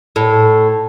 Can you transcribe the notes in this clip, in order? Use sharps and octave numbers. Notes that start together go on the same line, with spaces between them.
A2